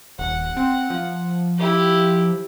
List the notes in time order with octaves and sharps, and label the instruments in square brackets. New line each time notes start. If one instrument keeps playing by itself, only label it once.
[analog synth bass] D#1 [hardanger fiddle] F#5
[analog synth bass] C4
F3
[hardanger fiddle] E4 G4